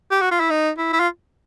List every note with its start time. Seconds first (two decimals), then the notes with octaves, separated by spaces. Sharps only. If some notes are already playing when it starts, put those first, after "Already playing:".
0.11 G4
0.21 F#4
0.31 F4
0.40 E4
0.50 D#4
0.78 E4
0.93 E4
1.00 F4